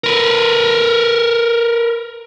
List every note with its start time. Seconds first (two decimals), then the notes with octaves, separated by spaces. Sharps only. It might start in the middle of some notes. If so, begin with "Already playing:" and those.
0.04 A#4 B4